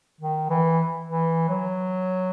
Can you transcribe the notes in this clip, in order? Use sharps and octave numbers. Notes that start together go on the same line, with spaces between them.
D#3
E3
E3
F#3